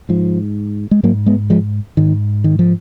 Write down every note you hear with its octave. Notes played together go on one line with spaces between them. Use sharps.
G#2 F3
G#3
G#2 F#3 A#3
G#3 B3
F3 G#3
G#2 D#3
D#3
F3